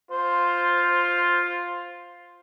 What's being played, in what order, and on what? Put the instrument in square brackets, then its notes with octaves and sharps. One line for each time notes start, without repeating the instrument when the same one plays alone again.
[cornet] F4 [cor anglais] C5